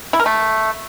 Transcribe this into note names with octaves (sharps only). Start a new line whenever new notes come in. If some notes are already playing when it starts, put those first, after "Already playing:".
E4
A#4
A3